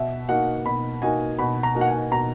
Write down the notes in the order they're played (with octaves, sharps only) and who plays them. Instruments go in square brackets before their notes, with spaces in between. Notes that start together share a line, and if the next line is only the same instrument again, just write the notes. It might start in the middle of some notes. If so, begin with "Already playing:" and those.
Already playing: [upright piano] B2 [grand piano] E5
[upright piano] A#3 D#4 F#4 [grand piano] F#5
[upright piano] B2 [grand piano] B5
[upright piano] A#3 D#4 F#4 [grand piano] G#5
[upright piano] B2 [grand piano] B5
[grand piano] A#5
[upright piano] A#3 D#4 F#4
[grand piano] F#5
G#5
[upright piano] B2 [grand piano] A#5